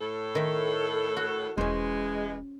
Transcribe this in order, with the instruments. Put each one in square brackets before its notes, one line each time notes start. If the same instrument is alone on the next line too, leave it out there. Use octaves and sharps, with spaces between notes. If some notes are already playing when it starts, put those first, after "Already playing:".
[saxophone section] A2 A4
[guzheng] D#3 E5
F#4
[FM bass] E1 [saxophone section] E3 G#3 [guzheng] C#4 C5